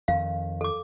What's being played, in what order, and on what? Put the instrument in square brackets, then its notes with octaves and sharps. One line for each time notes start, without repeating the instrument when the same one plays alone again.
[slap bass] F2 D#3 [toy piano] F5
[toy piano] A4 D6